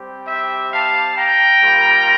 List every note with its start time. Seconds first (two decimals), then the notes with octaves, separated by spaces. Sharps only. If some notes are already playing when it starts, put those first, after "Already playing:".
Already playing: G3 C4 G4
0.27 E5 G5
0.71 F5 A5
1.17 G5 A#5
1.62 G3 A#3 F4